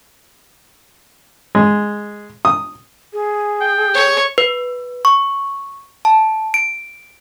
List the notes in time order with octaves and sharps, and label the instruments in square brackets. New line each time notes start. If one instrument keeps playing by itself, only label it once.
[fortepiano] G#3
D#6
[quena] G#4
[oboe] G5
[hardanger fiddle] C#5
[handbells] B4
C#6
A5
D7